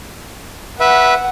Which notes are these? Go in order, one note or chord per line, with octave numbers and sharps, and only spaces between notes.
B4 E5 F#5